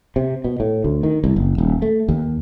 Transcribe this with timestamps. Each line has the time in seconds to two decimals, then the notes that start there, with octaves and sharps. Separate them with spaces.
0.16 C3
0.44 B2
0.60 A2
0.84 D2
1.03 D#3
1.24 C2
1.36 F#1
1.58 D#1
1.82 A3
2.09 D#2